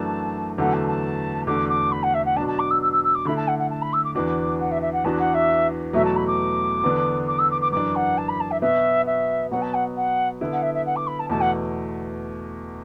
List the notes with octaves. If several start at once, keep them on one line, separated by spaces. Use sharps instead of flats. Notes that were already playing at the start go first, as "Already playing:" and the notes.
Already playing: F#2 E3 A3 D4 F#4 A5
E2 D3 F#3 A3 F#5
A5
A5
E2 D3 A3 D4 F#4 D6
D6
B5
F#5
E5
F#5
B2 F#3 D4 A5
A5
D6
E6
E6
E6
E6
D6
D3 A3 E4 B5
A5
F#5
F#5
A5
B5
E6
D6
E2 E3 D4 F#4 D6
F#5
E5
E5
F#5
E2 E3 D4 F#4 A5
F#5
E5
E2 B2 F#3 A3 E5
A5
B5
D6
E2 D3 B3 D4
D6
E6
D6
D6
F#2 E3 D4 D6
F#5
A5
B5
A5
E5
B2 B3 F#4 E5
E5
B2 F#3 B3 F#5
A5
F#5
F#5
D3 B3 E4
F#5
E5
E5
F#5
D6
B5
A5
E2 B2 A3 A5
F#5